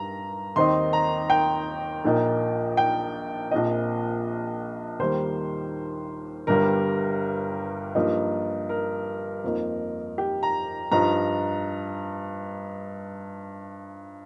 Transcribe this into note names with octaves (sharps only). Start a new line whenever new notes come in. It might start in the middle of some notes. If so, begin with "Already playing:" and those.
Already playing: G2 G3 A#5
D#2 D#3 C4 D#4 C6
A#5
G5
A#1 A#2 A#3 D#4
G5
A#1 A#2 F3 C4 D#5
D#2 D#3 G3 A#3 C5
G1 G2 G3 A#4
G2 F3 A#3 D#4
A#4
F2 F3 A#3 D#4
G4
A#5
G2 F3 D#4 A#5